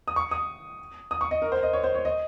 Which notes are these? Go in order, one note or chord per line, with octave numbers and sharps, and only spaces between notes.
D#6
C#6
D#6
D#6
C#6
D#5
A#4
C5
D#5
C#5
C5
C#5
D#5